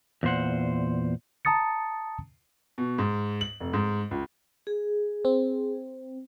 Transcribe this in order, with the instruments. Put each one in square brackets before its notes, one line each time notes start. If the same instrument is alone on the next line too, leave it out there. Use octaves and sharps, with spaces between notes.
[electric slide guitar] E2 A#2 C5 F#5
[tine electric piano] A5 A#5 D#6 A6 C#7
[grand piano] B2
G#2
F#7
F1
G#2
C#2
[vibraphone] G#4
[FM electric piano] C4